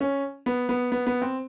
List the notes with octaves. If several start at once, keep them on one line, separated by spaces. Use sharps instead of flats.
C#4
B3
B3
B3
B3
C4